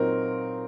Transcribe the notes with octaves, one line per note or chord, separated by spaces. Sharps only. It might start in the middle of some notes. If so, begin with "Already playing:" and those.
Already playing: A#2 F#3 C4 D#4 A#4